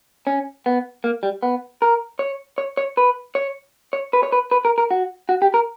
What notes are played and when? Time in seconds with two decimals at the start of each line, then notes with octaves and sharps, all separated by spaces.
0.27 C#4
0.66 B3
1.04 A#3
1.23 G3
1.43 B3
1.82 A#4
2.19 C#5
2.58 C#5
2.77 C#5
2.97 B4
3.35 C#5
3.93 C#5
4.13 B4
4.23 C#5
4.32 B4
4.51 B4
4.65 A#4
4.78 A#4
4.91 F#4
5.29 F#4
5.42 G4
5.54 A#4